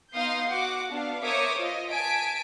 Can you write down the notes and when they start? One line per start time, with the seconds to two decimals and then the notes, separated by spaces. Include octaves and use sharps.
0.14 B3 D#4 F5 C6 D#6 G6
0.49 F#4 F#5 D6
0.90 B3 D4 F5
1.24 A#4 C5 C#5 E5 D6 D#6
1.58 F4 D#5
1.91 G#5 A5 B6 D7